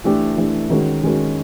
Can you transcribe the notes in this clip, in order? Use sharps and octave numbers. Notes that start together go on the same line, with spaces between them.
E3 A3 D4 G4
E3 A3 D4 G4
D#3 G#3 C#4 F#4 A#4
D#3 G#3 C#4 F#4 A#4